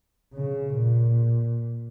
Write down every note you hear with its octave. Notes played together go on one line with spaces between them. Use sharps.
C#3
A#2